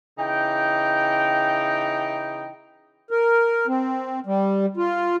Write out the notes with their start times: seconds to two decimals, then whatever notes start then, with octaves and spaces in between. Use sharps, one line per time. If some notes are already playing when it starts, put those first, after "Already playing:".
0.19 C#3 E3 D#4 G5
3.11 A#4
3.67 C4
4.26 G3
4.77 F4